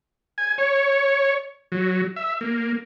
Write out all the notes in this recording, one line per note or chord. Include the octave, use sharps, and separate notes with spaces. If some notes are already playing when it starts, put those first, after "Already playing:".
G#5
C#5
F#3
E5
A#3